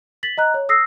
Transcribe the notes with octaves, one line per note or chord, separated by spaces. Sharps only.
A6 B6 F#7
D#5 A#5 F#6
C#5
D#6 E6 A#6 C7